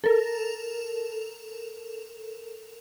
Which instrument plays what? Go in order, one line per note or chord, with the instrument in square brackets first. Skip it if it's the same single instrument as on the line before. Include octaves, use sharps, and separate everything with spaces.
[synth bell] A4 A#4